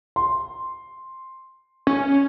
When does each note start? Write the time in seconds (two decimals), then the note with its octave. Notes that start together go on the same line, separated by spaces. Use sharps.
0.16 C6
1.87 C#4